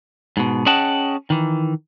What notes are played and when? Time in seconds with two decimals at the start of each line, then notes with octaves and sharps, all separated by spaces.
0.37 G#2 B2
0.66 C#4 G#4 D#5 F#5 G5 A5
1.30 D#3 E3